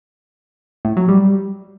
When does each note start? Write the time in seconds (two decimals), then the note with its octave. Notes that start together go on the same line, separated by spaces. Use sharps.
0.85 A2
0.97 F#3
1.09 G3